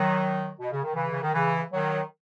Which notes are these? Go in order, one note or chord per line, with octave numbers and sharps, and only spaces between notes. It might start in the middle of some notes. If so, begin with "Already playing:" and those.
Already playing: D#3 F#3
B2
C#3
D#3
C#3 E3
C#3
D#3
C#3 E3
D#3 F#3